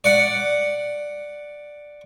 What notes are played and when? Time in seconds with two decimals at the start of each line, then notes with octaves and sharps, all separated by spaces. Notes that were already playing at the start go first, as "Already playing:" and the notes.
0.04 D5 F#5